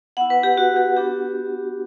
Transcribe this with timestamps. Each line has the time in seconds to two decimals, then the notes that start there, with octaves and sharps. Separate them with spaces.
0.17 B3 E4 F#5
0.30 B4
0.43 G4
0.57 F#4
0.76 G4
0.97 B3 D4 F#4 G4